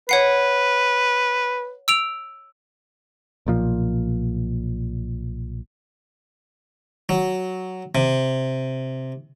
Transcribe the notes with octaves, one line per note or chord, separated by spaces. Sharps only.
B4 C#5 F#5 C7
E6 D7 F7
B1 A#2 F3
F#3
C3